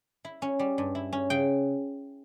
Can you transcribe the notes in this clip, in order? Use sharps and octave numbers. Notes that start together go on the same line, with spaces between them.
E4
C#4
G3
G2
E4
C#4
C#3 G5